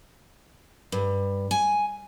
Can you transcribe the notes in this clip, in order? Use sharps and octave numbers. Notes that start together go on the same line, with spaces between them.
G2
G#5